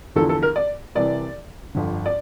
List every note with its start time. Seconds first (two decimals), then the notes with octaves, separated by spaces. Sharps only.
0.16 E2 D3 F3 A4
0.29 A4
0.43 A#4
0.56 D5
0.95 C2 C3 E3 D5
1.74 G1 F2 D3
2.06 D5